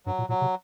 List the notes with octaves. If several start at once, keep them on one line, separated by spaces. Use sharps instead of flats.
G2 F#3
A#2
A#2 F#3
C3